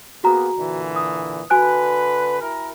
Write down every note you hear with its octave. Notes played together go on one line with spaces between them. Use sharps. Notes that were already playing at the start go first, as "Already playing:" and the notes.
A#3 B3 F#4 G#4 A#5
A#2 D3 E3
D#6
D3 F#4 B4 G#5 F#6
E4 A#4